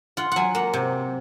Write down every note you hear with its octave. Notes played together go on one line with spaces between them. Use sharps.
F4 F#5
F#3 F#5 G#5
A#3 F#5
C3